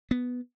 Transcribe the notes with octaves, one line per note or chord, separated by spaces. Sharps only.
B3